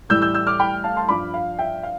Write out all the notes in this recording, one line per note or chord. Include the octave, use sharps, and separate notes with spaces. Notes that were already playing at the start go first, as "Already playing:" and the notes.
A2 E3 G3 E6 G6
E6 G6
E6 G6
D6 F6
G5 B5
F5 A5
A5 C6
G2 F3 B5 D6
F5
E5 G5
F5